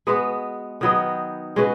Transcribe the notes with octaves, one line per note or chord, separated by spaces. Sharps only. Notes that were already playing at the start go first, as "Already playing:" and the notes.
G#3 B3 F#4 B4
D#3 F#3 B3 D#4
G#3 C#4 F#4 B4